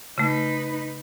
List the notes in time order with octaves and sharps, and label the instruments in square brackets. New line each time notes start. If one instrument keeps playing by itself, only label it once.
[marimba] C#3 A3 [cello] D#4 B4